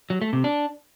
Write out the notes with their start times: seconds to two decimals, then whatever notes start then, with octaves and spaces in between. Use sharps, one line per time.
0.10 F#3
0.22 A3
0.33 C3
0.44 D4